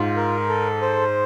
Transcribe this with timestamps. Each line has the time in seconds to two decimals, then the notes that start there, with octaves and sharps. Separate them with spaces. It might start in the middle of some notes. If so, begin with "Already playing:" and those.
Already playing: G#2 F4
0.16 A#4
0.49 A4
0.82 C5